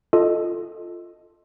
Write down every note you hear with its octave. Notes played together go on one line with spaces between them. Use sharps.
F4 A4 D#5